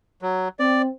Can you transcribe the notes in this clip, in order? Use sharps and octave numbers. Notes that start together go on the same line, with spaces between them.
F#3
C4 D5